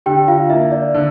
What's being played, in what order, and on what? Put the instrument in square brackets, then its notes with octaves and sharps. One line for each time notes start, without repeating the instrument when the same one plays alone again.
[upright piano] D3 [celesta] G4 G5
[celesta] F4 F5
[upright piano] A#3 [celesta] E4 E5
[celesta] D5
[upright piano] D3